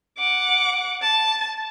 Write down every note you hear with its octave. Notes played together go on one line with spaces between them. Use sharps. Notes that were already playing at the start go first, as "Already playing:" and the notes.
F#5 D6
A5